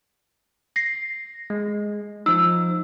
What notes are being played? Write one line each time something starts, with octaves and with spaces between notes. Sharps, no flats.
A#6 C7
G#3
F3 D#4 E6